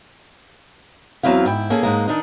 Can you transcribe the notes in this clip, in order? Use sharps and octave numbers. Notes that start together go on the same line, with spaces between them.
E2 F#3 C4 E4 F5
G#2 E4 G5
A#3 C#4 G#4 A4
G#2 G#3 A#3
D#3 D4 D#4